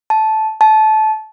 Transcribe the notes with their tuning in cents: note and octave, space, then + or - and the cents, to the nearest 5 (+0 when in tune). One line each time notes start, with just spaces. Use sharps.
A5 -10
A5 -20